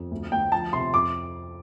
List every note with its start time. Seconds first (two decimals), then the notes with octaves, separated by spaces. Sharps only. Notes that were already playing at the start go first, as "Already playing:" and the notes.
Already playing: F2
0.11 D2
0.32 D2 G5
0.52 F3 A5
0.73 C3 C6
0.93 F2 D6